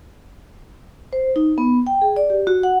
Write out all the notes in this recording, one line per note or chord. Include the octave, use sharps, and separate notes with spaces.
C5
D#4
B3
G5
G#4
D5
G4
F#4
F#5